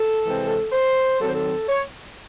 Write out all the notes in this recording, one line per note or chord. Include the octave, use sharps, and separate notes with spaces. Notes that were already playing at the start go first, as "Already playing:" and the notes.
Already playing: A4
C3 E3 G#3 C4
C5
D#3 F#3 C4 A4
C5
A4
C#5